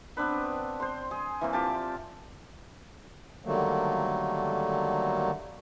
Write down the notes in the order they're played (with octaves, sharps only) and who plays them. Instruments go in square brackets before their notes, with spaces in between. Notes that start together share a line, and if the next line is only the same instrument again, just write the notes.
[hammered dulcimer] B3 C4 D4 B4
C5 C6
G#4
E3 A#3 C4
F4 G4 A5
[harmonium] D3 D#3 F#3 G3 A3 A#3